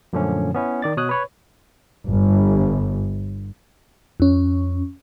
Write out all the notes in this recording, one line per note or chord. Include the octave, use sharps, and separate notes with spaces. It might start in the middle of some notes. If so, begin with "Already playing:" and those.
F#2 A#2 D3 F3 A3 C#4
B3 C#4 E4
D#3 D5 A6
B2 C#5 D#6 F#6
B4 C#5 B5
G1
F2 C#4